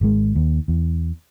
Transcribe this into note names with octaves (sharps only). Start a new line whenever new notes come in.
G#1 G#3
D#2
E2